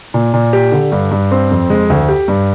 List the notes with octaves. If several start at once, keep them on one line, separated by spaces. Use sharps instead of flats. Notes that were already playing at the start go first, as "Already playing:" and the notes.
A#2
A#2
G4
D3
G2
G2
C4
F2
G#3
D2
G4
G2